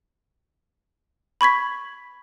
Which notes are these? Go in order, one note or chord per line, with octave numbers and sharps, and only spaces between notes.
B5 C#6 G#6 B6